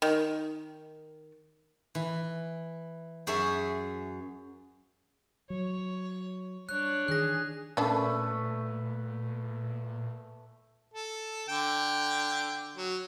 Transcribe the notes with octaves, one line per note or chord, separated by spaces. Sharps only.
D#3
E3
F#2 G#4 C#5 E5
F#3 C#5
G3 D4 C#5 F#6
D#3 E3 G#4 F#6 A#6
A#2 A3 C#4 D4 A4 B4
A4
D3 G5
F#3